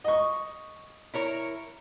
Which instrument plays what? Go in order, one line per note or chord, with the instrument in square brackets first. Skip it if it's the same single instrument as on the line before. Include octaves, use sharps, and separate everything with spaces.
[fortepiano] D#5 C#6
[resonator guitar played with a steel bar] E4 A#4 C#5